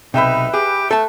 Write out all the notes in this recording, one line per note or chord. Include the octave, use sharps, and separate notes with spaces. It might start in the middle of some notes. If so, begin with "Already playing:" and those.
B1 C3 D#4 B4 E5 G5
G4 G#4
A3 A4 A5